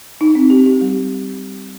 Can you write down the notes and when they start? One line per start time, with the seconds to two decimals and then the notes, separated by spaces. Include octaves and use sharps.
0.21 D#4
0.35 C4
0.50 G4
0.66 G4
0.81 G3